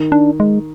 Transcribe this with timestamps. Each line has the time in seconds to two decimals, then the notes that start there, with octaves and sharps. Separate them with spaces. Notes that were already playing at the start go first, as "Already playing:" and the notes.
Already playing: D#3
0.12 D4
0.40 G#3